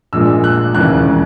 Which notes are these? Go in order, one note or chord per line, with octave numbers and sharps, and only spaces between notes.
A#1 A#2 G#3 E6
F#6
E1 D#2 C#3 E3 F#6